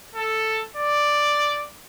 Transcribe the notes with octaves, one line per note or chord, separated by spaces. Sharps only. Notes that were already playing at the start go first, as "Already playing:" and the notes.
A4
D5